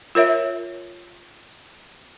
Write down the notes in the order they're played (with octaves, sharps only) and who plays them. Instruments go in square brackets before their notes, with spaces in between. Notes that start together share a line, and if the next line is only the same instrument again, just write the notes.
[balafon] F4 A#4 C#5 E5